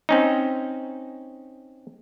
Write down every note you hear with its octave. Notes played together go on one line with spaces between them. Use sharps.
C4 C#4 D#4